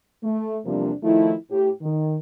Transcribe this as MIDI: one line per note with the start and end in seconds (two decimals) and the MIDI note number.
0.24 0.58 57
0.66 0.92 40
0.66 0.92 48
0.66 0.92 53
0.66 0.92 55
0.66 0.92 58
0.66 0.92 62
1.03 1.33 51
1.03 1.33 53
1.03 1.33 57
1.03 1.33 64
1.50 1.70 45
1.50 1.70 67
1.82 2.17 51